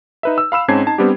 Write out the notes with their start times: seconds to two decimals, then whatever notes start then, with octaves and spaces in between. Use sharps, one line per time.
0.23 D#4 B4 E5
0.38 E6
0.52 F5 B5 E6 E7
0.68 G#2 C4 C#4 A5 G#6 C7
0.86 D#4 A5
0.98 G3 B3 C4 D4 G4